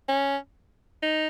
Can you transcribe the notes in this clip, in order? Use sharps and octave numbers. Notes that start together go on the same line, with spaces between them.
C#4
D#4